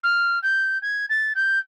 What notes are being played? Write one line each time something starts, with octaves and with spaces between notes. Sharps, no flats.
F6
G6
G#6
A6
G6